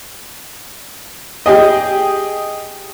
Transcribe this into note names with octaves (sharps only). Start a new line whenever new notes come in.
G4 G#4 D#5